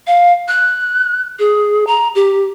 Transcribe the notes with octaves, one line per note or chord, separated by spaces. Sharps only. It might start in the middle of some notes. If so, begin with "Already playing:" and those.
F5
F#6
G#4
A#5
G4